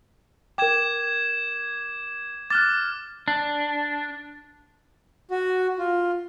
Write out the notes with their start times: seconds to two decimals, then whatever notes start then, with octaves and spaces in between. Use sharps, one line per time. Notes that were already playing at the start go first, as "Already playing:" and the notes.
0.58 A#4 G5 D6 G#6 E7
2.50 D6 F6 F#6 A6
3.28 D4
5.31 F#4
5.78 F4